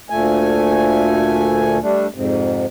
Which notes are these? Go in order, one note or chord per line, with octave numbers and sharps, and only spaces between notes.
D2 A#2 A3 G#5
G3 A3 D4
F2 G#2 C3